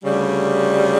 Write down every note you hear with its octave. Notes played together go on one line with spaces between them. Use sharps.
D2 C#3 G3